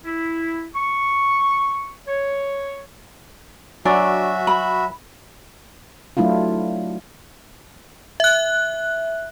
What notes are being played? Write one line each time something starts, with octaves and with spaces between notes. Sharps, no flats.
E4
C#6
C#5
F#3 D4 F#4 E5 G#5 C#6 A6
B5
F#3 A3 D4 E4 F4
E5 F#6